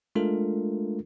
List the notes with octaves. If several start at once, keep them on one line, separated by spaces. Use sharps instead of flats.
G#3 A3 D4 F4 A4 A#4